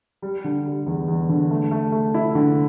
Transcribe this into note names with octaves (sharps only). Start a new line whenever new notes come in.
G3
D3
G3
E2
E2
D3
A3
A3
A3
E4
D3